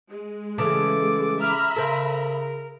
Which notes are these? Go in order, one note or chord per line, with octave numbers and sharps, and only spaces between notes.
G#3
C#3 E3 A3 A4 D6
E5 A#5 B5 F6
C#3 A4 A#4 C5